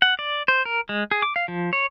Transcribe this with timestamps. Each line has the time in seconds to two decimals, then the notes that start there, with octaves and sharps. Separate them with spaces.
0.02 F#5
0.19 D5
0.48 C5
0.65 A#4
0.89 G#3
1.11 G#4
1.22 D6
1.36 F5
1.48 F3
1.73 C#5